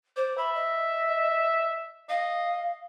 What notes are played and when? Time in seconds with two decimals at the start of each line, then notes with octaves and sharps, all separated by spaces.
0.16 C5 D5
0.38 E5 B5
0.55 D#5
2.09 D#5 F5